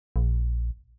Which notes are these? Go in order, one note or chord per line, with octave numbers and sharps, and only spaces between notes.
A#1